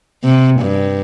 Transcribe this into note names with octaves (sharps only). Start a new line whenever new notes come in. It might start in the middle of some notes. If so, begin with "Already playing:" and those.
C3
G2